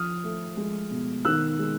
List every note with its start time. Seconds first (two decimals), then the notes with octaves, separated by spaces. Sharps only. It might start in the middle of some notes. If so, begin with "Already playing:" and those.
Already playing: F3 D#6 F6
0.24 A3
0.57 G#3
0.91 B2
1.25 D#3 E6 F#6
1.59 G#3